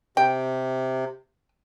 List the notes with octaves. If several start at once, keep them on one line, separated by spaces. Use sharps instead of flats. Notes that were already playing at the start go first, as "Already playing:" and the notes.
C3 G5